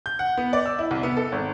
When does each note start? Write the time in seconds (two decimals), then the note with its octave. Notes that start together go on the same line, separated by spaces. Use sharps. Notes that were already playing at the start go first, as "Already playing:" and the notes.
0.06 G6
0.19 F#5
0.37 B3
0.53 D5
0.66 E6
0.79 E4
0.91 C2
1.03 B3
1.17 A4
1.32 G#1